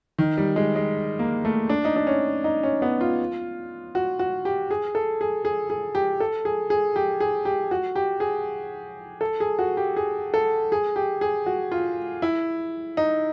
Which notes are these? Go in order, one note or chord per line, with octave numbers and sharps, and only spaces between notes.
D#3
G3
G#3
G#3
A#3
A3
D4
D#4
D4
C#4
D#4
C#4
B3
F4
F#4
F#4
G4
G#4
A4
G#4
G#4
G#4
G4
A4
G#4
G#4
G4
G#4
G4
F#4
G4
G#4
A4
G#4
F#4
G4
G#4
A4
G#4
G4
G#4
F#4
F4
E4
D#4